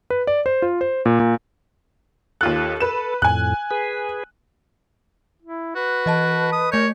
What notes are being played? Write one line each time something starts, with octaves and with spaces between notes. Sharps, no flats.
B4
D5
C5
F4
C5
A#2
A#2
D#2 F4 A4 F#6
B4 E7
F2 A2 G#5 F#6
G#4 B4
E4
F#4 B4
E3 D#5 A5
D#6
A3 A#4 C#5 G6